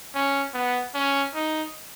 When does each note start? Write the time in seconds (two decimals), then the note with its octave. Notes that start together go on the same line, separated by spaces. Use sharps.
0.15 C#4
0.54 B3
0.94 C#4
1.35 D#4